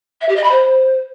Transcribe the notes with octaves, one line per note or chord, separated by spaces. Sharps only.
E5
G4
D#5
B5
C5